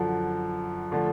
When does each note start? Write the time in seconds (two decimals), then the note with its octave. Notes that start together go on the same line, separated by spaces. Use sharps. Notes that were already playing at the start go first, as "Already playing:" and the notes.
Already playing: F#2 D3 F3
0.92 D3 F3 A3